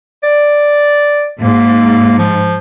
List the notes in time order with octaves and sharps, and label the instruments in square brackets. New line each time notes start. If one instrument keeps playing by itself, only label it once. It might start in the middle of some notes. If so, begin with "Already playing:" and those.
[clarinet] D5
[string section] G#2 [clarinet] A#3
[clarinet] F3